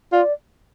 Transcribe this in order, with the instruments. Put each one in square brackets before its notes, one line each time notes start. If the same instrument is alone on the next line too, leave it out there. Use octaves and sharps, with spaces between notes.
[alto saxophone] F4 [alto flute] D5